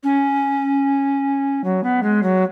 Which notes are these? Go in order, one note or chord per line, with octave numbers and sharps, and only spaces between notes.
C#4
F#3
B3
G#3
F#3